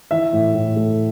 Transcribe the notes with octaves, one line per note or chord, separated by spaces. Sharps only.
E3 E5
A2
A2
A3